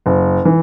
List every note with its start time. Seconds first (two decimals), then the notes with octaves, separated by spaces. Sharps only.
0.06 F#1
0.45 E3